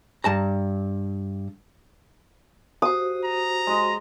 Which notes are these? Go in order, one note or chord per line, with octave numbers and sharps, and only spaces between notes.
G2 A5 A#5
F#4 G4 C5 D#6
A#5
G#3 D#5